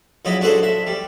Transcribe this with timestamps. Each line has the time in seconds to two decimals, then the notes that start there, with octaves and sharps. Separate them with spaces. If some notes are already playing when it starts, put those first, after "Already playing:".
0.25 C#2 F#3 E4 D#5 B5
0.41 D4 F#4 G#4 A4 C5
0.63 E5
0.87 G3